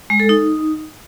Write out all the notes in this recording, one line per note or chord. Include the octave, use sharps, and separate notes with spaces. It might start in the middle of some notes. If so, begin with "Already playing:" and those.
G#3
A4
D#4